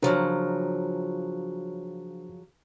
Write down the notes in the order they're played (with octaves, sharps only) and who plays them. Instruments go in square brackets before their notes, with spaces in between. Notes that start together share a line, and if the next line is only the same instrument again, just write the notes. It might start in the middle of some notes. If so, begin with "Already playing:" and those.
[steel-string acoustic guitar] C#3 F3 F#3 [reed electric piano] D4 A#4 C5